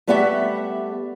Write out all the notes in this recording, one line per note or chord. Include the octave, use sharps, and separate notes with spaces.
G3 A3 B3 G4 E5 F#5